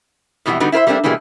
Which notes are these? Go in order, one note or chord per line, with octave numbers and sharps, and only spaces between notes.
F2 B2 E3 G3 F#4
D3 G3 B3 D#4 F#4
E4 F4 A#4 C5 E5
G3 A3 A#3 C4 D4
B2 E3 G3 G#3 A#3